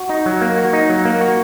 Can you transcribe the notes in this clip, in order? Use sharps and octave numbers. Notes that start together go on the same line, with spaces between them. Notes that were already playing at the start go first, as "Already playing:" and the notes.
Already playing: F#4
D#4
F#3
A#3
F#4
D#4
F#3
A#3
F#4